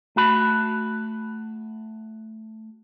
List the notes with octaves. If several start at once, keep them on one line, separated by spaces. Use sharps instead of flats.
A3 F#4 B5